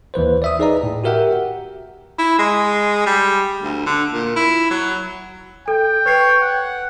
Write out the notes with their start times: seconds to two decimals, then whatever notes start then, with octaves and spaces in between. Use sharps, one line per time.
0.14 D#2 E3 B4 C5
0.42 D5 E5 D#6
0.59 D#4 G#4 B4 D5 D#5 A#5
0.83 A2
1.04 F#4 G4 A#4 E5 F#5 G5
2.19 E4
2.39 G#3
3.06 G3
3.63 D2
3.86 D3
4.13 A#2
4.36 E4
4.70 F#3
5.68 A4 G5
6.06 B4 C#5 C7
6.42 F#5